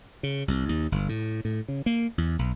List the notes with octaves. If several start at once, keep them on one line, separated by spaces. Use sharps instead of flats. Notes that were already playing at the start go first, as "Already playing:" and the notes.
C#3
C2
D#2
G1
A2
A2
C#3
A#3
E2
B1